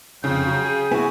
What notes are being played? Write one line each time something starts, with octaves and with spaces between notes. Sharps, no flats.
F2 C#3 G5
F#3
G#4
B3 E4 F#4 G#5